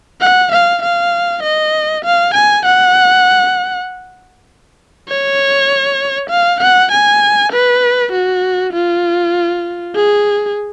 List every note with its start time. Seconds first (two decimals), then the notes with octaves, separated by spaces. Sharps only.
0.21 F#5
0.52 F5
0.83 F5
1.43 D#5
2.05 F5
2.34 G#5
2.65 F#5
5.09 C#5
6.30 F5
6.61 F#5
6.92 G#5
7.52 B4
8.12 F#4
8.73 F4
9.95 G#4